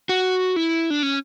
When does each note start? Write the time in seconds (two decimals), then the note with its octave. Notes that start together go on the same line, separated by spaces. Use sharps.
0.09 F#4
0.56 E4
0.90 D4
1.03 C#4